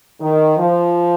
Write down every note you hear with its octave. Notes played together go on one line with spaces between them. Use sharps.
D#3
F3